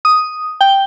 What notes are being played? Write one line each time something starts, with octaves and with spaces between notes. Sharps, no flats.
D#6
G5